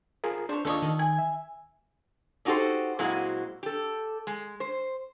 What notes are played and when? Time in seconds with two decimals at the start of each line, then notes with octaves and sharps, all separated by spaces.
0.24 F4 G#4 A#4
0.49 D4 C5 C#5
0.65 D#2 D4 F4 A4 C#5 D#5
0.82 D#3
0.99 G#5 G#6
1.18 E5
2.45 D4 D#4 F#4 G4 A4 C5
2.99 A#2 F#3 G#3 C4 E4 F#4
3.63 G4 A4
4.27 G#3
4.60 C5